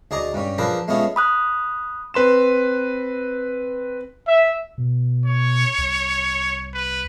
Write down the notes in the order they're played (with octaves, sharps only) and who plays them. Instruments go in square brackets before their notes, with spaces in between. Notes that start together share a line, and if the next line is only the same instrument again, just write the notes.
[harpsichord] D2 G#4 D5 D#5 A#5
G2 G3 C#4
F3 D4 G#4 A#4 B4
G#3 A3 B3 C#4 F4 G#4
[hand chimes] B5 D#6 F#6
[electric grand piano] C4 B4 C6 E7
[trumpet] E5
[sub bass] B2
[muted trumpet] C#5
[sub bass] C2
[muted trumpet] B4